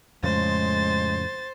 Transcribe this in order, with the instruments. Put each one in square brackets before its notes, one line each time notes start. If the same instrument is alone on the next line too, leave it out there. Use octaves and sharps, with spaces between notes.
[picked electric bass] F2 A2 C#3 [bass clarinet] G#3 [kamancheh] C5 [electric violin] A6